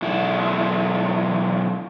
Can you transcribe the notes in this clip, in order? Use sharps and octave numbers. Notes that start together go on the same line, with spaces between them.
B1 E4